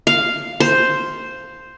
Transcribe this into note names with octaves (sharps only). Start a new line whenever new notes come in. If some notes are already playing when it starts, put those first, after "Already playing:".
F5
C5